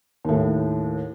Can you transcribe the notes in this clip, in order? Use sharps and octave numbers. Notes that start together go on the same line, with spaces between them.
D#2 A2